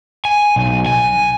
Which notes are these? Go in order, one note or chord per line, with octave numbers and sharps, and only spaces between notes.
G#5
B1
G#5